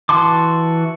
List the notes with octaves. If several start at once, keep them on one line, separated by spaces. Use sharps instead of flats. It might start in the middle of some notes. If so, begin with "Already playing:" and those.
E3 F#4 A5 C6 D6